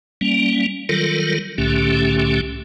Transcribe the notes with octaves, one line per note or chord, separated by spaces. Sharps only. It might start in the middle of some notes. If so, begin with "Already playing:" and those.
G3 A#3 C#4
D#3 F#3 G3 F4 A4 A#4
C2 A2 D3 A3 C#4 G4